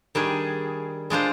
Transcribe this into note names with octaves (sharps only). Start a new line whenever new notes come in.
D#3 G3 D4 G#4
G#3 D4 F4 C5